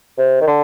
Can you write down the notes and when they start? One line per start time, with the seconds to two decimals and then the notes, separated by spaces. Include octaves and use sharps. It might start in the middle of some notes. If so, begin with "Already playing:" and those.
0.18 C3
0.41 D#3
0.47 D3